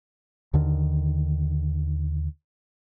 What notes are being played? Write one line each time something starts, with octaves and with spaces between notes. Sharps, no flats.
D#2 D3 D#3